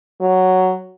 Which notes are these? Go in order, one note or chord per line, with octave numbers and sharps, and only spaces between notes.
F#3